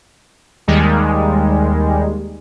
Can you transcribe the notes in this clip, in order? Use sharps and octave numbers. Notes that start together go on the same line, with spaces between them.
D#2 D#3 G3 G#3